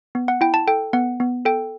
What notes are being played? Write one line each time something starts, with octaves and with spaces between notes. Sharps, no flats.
B3
F#5
E4 G5
A5
A4 G5
B3 F#5
B3
A4 G5